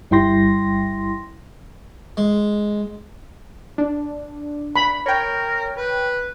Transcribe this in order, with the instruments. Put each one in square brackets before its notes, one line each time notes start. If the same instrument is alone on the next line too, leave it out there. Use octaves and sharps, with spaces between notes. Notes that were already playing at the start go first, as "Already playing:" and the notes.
[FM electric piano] G1 G3 E4 G5 C6 A#6
[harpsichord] G#3
[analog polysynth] D4
[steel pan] B5
[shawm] A#4 [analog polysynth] C#5 G5
[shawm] B4